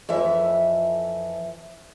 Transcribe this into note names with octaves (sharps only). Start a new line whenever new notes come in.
F2 E3 E5